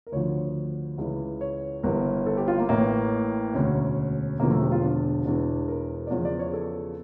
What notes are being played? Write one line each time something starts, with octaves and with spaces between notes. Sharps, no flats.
A#4
D2 D3 F3 C#5
C#2 C#3 E3
C#5
G1 G2 E3 A#4
A4
G4
F4
A#3
A1 A2 E3 A#3
E1 D2 D3 C#4
E1 E2 D3 F3 A#3
A3
G4
F4
D4
E1 E2 E3 D4
A#4
D5
E2 C#3 F3 C#5
D5
C#5
A4